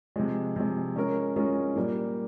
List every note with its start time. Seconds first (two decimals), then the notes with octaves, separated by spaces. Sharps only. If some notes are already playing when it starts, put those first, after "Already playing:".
0.16 C3 F3 G#3
0.56 C3 F3 G#3
0.96 G#3 C#4 F4 A#4
1.36 G#3 C#4 F4 A#4
1.76 A#2 G3 A#3